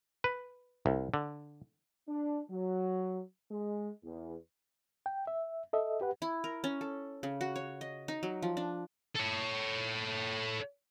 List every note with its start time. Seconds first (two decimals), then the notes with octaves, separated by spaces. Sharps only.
0.24 B4
0.86 C2
1.14 D3
2.08 D4
2.49 F#3
3.50 G#3
4.03 E2
5.06 G5
5.27 E5
5.73 A4 D#5 E5
6.01 G4 B4 F#5
6.22 E4
6.44 A#4
6.64 C#4
6.81 A4
7.23 C#3
7.41 F#4
7.56 C#5
7.81 D#5
8.08 D#4
8.23 F#3
8.42 F3
8.57 D4
9.15 A4 C#5